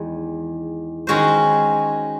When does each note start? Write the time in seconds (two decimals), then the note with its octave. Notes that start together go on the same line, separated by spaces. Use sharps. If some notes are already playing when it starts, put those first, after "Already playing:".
Already playing: E2 D#3 G#3
1.07 D#3 G#3 C#4 F#4 C5